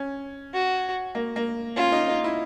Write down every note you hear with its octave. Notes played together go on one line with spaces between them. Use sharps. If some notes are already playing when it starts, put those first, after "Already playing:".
Already playing: C#4
F#4
A#3
A#3
C#4 F4
D#4
D#4
E4